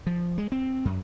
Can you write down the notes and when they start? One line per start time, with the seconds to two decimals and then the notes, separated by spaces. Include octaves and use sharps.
0.07 F3
0.38 G#3
0.52 C4
0.85 F#2